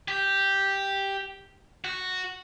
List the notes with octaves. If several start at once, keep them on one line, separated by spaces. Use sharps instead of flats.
G4
F#4